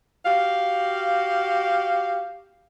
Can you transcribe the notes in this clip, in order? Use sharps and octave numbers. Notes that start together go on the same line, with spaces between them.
F#4 G4 F5